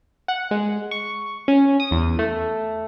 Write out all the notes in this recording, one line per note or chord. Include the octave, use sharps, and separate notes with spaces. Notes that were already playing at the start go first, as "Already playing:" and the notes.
F#5
G#3
C#6
C#4
D#6
E2
A3